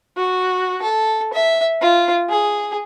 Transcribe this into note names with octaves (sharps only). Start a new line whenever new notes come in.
F#4
A4
E5
F4
G#4